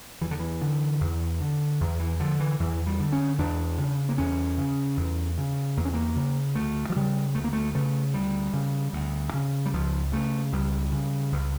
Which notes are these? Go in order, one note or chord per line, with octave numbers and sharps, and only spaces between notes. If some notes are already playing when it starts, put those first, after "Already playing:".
E2 E3
D3
E3
D3
E2
D3
E2
E3
D3 F3
E3
E2 E3
G3
D3
C#4
E2 D4
C#3
A#3
E2 C#4
C#3
E2
C#3
E2 A#3
C#4
A#3
C#3
D2 A3
F3
C#3 G3
D2 A3
A#3
A3
C#3 A3
D2 G3
C#3
D2
C#3
G3
C#2 F3
C#3 A3
C#2 G3
C#3
C#2